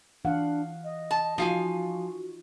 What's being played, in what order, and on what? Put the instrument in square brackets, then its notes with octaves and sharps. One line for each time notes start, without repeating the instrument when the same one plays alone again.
[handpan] E3 F5 F#5 [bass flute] D4
[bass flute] D#5
[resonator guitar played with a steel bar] A5
[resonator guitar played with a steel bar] F3 F5 G#5 [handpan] D#4 F4 [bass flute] F#4